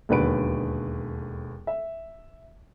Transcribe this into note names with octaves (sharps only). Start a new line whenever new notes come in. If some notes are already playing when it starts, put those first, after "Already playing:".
E1 D#2 D3 B4 D7
E5